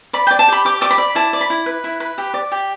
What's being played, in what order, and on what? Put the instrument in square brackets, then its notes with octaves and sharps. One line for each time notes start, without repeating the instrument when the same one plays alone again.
[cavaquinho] D5 B5
G5
D5
A5
G4 B5
G4 D6
D5 D6
B5
D5
E4 A5
D5
B5
E4
B4
E4
B4
G4
D5
G4